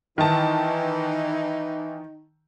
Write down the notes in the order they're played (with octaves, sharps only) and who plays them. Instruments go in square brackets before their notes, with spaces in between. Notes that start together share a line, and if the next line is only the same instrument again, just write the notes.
[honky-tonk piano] D#3 A5 [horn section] E3 [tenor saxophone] D#4